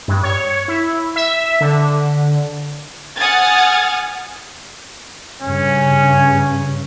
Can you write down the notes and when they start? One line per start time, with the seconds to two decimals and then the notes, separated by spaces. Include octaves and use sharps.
0.08 G2
0.23 C#5
0.68 E4
1.16 E5
1.61 D3
3.17 F#5 G#5 D#6 F6 G#6 A6
5.42 G2 C#3 C#4